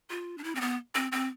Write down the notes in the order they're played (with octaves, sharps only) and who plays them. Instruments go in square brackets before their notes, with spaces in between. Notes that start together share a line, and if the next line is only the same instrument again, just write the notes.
[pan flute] F4
D4
E4
C4
B3
C4
C4